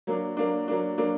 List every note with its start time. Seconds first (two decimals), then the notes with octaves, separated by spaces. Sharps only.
0.07 F#3 A#3 D4
0.37 F#3 A#3 D4
0.68 F#3 A#3 D4
0.98 F#3 A#3 D4